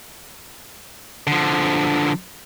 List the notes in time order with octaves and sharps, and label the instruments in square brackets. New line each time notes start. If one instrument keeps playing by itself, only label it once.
[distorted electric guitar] D3 F3